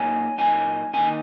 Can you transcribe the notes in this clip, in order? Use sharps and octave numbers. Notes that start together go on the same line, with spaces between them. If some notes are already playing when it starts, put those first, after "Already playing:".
Already playing: A#2 F#3 A#3 D#4 G#5
A#2 F#3 A#3 D#4 G#5
D#3 A#3 D#4 G#5